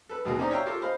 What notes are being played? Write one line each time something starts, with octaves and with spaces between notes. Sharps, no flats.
A4 B4
D#2 B2 A#3 F#4 G#4 A#4
C#4 D#4 C5 D5 D#5 A#5
C#5 E5 F5 G5 A#5 C#6
F4 G4 A4 A#4 F5
C5 D#5 F5 B5